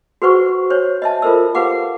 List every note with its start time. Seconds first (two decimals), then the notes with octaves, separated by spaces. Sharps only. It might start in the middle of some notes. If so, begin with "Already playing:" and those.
0.22 F#4 G#4 B4 C5 F#5 C#6
0.70 C5 C#5
1.02 D#5 E5 A5
1.22 F4 A4 A#4 C5 E6
1.55 G4 B4 F5 F#5 D6